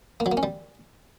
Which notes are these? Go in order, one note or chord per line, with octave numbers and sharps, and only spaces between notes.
A#3
F#3
A#3
C#4
G3